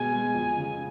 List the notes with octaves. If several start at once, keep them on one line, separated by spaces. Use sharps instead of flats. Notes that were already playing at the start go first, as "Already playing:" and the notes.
Already playing: B2 G#3 G#5
G#3
F2
C#3